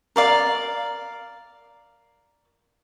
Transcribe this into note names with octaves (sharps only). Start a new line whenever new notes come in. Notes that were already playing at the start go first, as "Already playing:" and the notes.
A#4 D5 F5